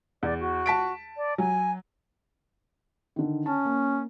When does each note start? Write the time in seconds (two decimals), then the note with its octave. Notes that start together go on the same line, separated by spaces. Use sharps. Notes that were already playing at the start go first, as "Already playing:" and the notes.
0.23 E2 D5
0.40 F#4
0.66 A5 B6 D7
1.17 D5
1.38 F#3 G#5
3.16 D3 D#3
3.46 C#4 A5
3.65 A#3